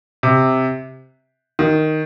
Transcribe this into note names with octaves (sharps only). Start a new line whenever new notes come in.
C3
D#3